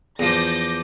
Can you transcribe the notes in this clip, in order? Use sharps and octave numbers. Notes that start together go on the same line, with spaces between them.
E2 F3 D6 G6 A#6